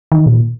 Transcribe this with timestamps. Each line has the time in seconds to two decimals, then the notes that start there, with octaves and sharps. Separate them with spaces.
0.12 D#3
0.26 A#2